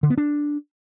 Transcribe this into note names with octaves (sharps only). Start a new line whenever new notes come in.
D3
B3
D4